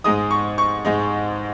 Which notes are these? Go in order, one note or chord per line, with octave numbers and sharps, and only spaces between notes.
G#2 G#3 D#4 D#6
C#6
C#6
G#2 G#3 D#4